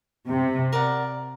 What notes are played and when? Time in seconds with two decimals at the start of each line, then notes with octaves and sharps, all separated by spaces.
0.29 C3
0.73 A#4 D5 F#5